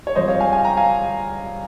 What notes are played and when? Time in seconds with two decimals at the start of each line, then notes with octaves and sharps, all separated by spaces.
0.07 C#5
0.15 G2 F3 G#3 C4 F4 C5 D#5
0.28 C#5 F5
0.40 F5 G#5
0.53 F5 G#5
0.65 G5 A#5
0.77 F5 G#5